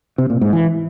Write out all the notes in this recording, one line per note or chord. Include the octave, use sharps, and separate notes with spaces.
C3
A#2
G#2
E3